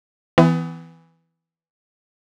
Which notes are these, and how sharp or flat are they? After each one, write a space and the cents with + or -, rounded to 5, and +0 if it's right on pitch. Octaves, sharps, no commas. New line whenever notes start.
E3 +0 B3 +35